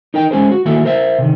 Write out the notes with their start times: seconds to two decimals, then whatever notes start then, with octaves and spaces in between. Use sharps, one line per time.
0.14 D#4 A#4 G5
0.31 G#3 C#4 G#4 C5
0.52 F#4
0.65 D#3 A3 A#3 E4 F#4 A4
0.85 A#4 C5 E5
1.18 C3 D#3